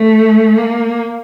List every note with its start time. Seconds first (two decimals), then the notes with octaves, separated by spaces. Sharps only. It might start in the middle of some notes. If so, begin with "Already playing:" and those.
Already playing: A3
0.58 A#3